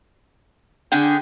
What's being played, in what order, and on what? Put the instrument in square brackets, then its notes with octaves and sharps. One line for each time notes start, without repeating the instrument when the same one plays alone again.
[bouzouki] D3 G#4 G5 [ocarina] D4